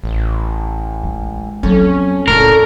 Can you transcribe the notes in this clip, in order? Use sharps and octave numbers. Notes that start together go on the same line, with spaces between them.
A1
G#3
F2 F#3 A#3 C#4
D1 C#2 A2 A3 C#4 D4 A#4